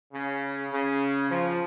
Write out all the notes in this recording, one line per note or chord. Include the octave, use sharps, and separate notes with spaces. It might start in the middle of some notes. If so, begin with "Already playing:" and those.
C#3
C#3
F3